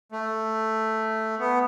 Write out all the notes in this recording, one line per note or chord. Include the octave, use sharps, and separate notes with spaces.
A3
B3